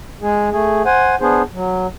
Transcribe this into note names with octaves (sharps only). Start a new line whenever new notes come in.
G#3 G#4
A3 G#4
C5 F#5 G#5
B3 D4 G#4 C5
F#3